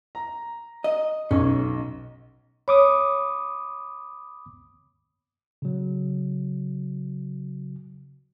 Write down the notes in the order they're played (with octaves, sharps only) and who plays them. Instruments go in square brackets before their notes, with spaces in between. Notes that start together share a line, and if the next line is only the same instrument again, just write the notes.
[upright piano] A#5
[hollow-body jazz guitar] D#5
[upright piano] B1 [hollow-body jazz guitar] C#4
[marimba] C#5 [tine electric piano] B5 D6 D#6
[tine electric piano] C#3 F#3